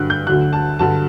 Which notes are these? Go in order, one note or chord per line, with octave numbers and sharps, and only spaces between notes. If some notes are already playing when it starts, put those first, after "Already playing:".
Already playing: G2 D3 F#3 F#6
G6
D2 D3 F#3 F#6
A5
G2 D3 F#3 A5